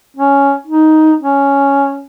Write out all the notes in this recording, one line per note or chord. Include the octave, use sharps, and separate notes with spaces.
C#4
D#4
C#4